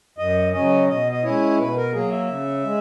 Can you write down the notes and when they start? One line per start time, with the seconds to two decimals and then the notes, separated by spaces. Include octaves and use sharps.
0.18 F#2 D#5
0.53 C#3 F#3 C#4 D#5
0.88 B2 D#5
1.12 D#5
1.23 G#3 C#4 E4 C#5
1.58 B2 B4
1.76 A#4
1.93 F#3 A#3 G#4
2.11 E5
2.28 C#3
2.64 G#3